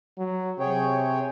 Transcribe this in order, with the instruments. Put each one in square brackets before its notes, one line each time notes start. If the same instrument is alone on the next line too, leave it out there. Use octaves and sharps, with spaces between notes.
[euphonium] F#3
[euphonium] C3 [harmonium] G#4 C#5 G5